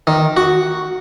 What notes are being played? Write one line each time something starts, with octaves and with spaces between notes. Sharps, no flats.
D#3
F#4